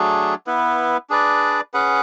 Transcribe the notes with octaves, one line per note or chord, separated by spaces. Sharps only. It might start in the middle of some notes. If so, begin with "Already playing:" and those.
Already playing: F#3 A3 D4 G#4
B3 E4 B4
D4 G#4 B4 D5
C#4 G#4 B4 F#5